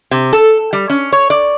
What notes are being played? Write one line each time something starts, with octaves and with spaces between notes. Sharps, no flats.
C3
A4
G3
C#4
C#5
D5